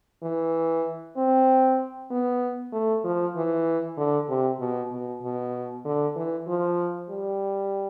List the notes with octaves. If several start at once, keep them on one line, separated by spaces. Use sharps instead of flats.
E3
C4
B3
A3
F3
E3
D3
C3
B2
B2
B2
D3
E3
F3
G3